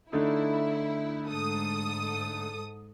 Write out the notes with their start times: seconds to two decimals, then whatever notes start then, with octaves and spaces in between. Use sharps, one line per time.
0.12 D3 A3 D#4 E4
1.30 G#2 A4 D#6